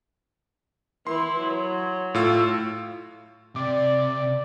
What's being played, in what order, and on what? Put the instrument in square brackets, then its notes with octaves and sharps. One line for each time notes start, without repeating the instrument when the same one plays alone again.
[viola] E3 E4 [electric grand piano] C6
[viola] F#3
[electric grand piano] A2 F4 E6
[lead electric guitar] C3 [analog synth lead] D5